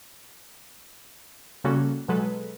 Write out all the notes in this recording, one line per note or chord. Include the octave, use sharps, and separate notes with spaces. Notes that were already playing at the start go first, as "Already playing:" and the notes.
C#3 G3 A#3 C#4 F#4 A4
B2 F#3 G#3 A4 B4